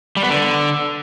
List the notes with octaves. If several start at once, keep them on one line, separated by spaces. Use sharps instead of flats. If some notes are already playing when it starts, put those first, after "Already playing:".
G3
B3
D3